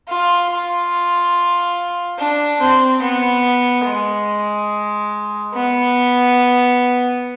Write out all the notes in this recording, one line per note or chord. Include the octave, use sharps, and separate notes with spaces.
F4
F4
D4
C4
B3
G#3
B3